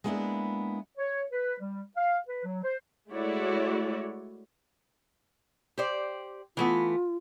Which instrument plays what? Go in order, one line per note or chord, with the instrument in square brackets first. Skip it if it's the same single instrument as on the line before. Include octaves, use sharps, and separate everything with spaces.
[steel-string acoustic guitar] G#3 A#3 B3 D4 E4
[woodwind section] C#5
B4
G3
F5
B4
F#3
C5
[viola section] G#3 A3 E4 F#4 C#5 D5
[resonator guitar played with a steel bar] G4 C5 D5
[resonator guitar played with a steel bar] E3 A3 B3 [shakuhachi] F4